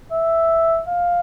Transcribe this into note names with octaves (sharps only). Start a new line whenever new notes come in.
E5
F5